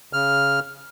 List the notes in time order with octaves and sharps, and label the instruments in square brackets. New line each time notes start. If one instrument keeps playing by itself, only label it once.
[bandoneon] C#3 F6